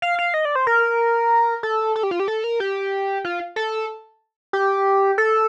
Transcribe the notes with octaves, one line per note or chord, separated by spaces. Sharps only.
F5
F5
D#5
D5
C5
A#4
A4
A4
G4
F4
G4
A4
A#4
G4
F4
A4
G4
A4